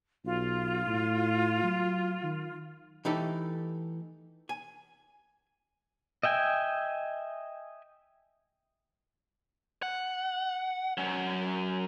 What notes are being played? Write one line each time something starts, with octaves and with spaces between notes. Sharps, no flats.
B1 F4
A2
F#3
D#3
E3 A3 D#4 G4 A4
G#5
D#5 E5 G5 G#5
F#5
F#3 C#4